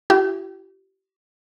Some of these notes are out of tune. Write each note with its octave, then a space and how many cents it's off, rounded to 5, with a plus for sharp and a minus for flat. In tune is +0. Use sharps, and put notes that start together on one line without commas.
E4 +35 G4 -40